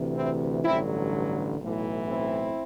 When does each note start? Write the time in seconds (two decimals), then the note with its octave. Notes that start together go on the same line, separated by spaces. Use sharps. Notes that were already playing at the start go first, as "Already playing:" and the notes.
Already playing: D2 C3 E3
0.15 C4 E4
0.63 A1 G2 D3 F#3 C4 E4
1.59 B1 A2 E3
2.08 C4 E4